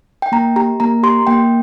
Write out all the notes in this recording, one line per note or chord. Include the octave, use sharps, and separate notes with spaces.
G5
A#3 A#5
G4 A#5
A#3 A#5
G4 C6
A#3 G5